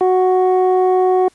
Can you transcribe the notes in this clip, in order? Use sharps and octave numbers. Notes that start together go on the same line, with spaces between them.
F#4